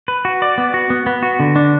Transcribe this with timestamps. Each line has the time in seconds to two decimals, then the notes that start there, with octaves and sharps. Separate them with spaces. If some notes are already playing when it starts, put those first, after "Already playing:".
0.08 B4
0.25 F#4
0.42 D5
0.58 B3
0.74 F#4
0.90 B3
1.06 B3
1.23 F#4
1.40 D3
1.56 D4